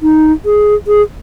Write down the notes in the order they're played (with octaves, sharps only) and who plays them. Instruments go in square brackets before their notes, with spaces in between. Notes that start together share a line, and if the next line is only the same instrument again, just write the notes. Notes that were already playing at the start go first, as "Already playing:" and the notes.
[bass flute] D#4
G#4
G#4